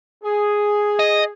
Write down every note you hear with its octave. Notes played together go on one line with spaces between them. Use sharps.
G#4
D#5